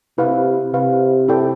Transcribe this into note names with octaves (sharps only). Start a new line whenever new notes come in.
C3 E4 B4 F5
C3 E4 B4 F5
E4 A4 D5 G5